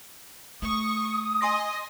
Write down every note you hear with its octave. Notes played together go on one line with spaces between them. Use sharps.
A3 C#6 D#6
D#5 G#5 C6 A#6